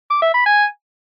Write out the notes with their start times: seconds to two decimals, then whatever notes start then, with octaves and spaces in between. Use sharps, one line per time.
0.10 D6
0.22 E5
0.34 B5
0.46 G#5